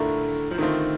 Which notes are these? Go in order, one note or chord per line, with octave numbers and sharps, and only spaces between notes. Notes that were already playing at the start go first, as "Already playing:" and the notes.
Already playing: A2 D3 A3 D4 F4 A#4
F3
D3 D#3 A3 C4 F4